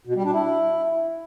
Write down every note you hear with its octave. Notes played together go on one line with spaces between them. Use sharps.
B2
G3
D4
E4